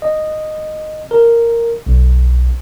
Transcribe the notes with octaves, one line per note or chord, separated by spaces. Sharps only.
D#5
A#4
B1